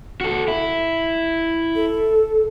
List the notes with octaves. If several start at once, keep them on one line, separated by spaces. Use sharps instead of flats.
F#4 A4
E4
A4